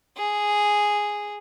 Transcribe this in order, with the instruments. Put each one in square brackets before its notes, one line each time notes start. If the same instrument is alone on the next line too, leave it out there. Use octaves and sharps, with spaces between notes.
[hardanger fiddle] G#4